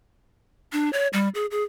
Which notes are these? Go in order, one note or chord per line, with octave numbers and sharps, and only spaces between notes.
D4
C#5
G3
G#4
G#4